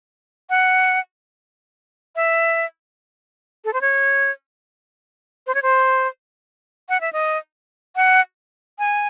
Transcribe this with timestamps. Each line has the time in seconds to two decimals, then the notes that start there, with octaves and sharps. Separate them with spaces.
0.50 F#5
2.16 E5
3.65 A4
3.73 C5
3.81 C#5
5.47 C5
5.55 C#5
5.62 C5
6.89 F#5
7.01 E5
7.13 D#5
7.96 F#5
8.79 G#5